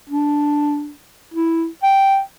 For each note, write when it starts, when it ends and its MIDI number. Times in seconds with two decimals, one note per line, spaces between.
0.10 0.91 62
1.34 1.66 64
1.83 2.20 79